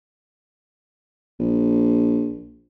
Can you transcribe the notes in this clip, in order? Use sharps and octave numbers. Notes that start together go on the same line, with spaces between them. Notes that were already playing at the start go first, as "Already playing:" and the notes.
A#1